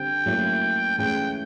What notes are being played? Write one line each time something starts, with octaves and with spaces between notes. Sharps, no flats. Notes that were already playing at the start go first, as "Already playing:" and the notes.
Already playing: D3 G3 C4 G5
A2 F#3 A#3 C#4 E4
A2 E3 G#3 C#4 E4 G5